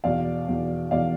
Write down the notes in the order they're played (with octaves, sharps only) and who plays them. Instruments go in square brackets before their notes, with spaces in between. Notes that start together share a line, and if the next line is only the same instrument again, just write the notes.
[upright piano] E2 B2 D5 F5
E2 B2
E2 B2 D5 F5